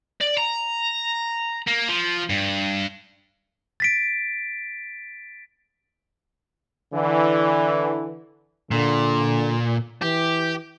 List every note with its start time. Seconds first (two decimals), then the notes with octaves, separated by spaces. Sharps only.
0.21 D5
0.38 A#5
1.67 A#3
1.88 F3
2.30 G2
3.80 A6 B6 D7
6.93 D3 E3
8.71 A#2 D3
10.02 E3 G4